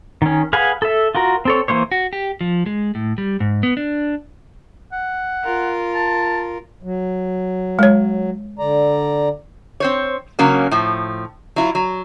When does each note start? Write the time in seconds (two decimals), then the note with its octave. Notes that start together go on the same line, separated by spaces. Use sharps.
0.22 D#3 C#4
0.53 G#4 B4 F5 F#5 G#5
0.82 A4 E5
1.15 F4 F#4 A#4
1.45 C4 A4 C#5
1.68 E3 A#3 C5 C#5
1.92 F#4
2.13 G4
2.41 F3
2.66 G#3
2.95 A2
3.18 G3
3.40 G#2
3.63 B3
3.77 D4
4.92 F#5
5.44 F4 A#4
5.95 A5
6.83 F#3
7.79 G#3 C#5
8.59 D3 D5 A#5
9.80 C4 C5 C#5
10.39 C#3 F#3 A#3 C#4
10.71 A2 F3
11.56 F#3 E4 F4
11.75 F#3